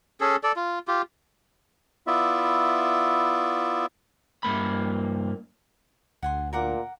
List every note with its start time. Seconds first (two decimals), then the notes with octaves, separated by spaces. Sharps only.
0.21 C#4 G#4 A4
0.43 A4 D5
0.56 F4
0.88 F4 G4
2.07 B3 E4 F4 D5 E5
4.43 G2 A#3 B5
6.23 D2 F#5 G#5 C6
6.53 A#2 A#4 F#5 D6